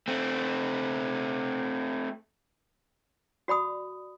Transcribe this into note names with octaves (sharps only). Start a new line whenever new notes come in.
A3 C4
F#4 D5 B5 D#6